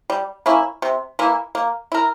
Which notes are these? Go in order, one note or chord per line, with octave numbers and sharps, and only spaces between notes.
G3
A#3 C#4 E4
C3
E3 A#3 E4
A#3
E4 A#4